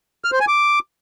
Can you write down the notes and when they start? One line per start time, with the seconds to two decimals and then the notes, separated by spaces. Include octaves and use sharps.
0.24 F6
0.32 C5
0.40 G#5
0.48 D6